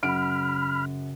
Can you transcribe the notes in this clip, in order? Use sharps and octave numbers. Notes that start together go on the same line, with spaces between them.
F#2 C#3 F#5 B5 F6 D7